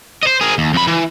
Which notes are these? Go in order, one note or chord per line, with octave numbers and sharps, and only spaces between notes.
C5 D#5
G#4 A#4
D#2
F2 B5
E3